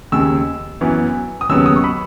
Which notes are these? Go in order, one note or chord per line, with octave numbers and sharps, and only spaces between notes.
D#2 C#3 G#3 E6
F#2 E3 B3
D#6
D#2 C#3 F#3 B3 E6
D#6
C#6
B5